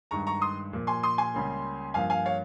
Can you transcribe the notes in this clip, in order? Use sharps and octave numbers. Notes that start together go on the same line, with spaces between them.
G2 D#3 G#3 A#5 C#6
A#5 C#6
C6 D#6
A#2 F3 A#3
G#5 C6
C6 D#6
G#5 C6
C#2 C#3 G3 A#3
G2 F3 A#3 F5 G#5
F5 G#5
C#5 F5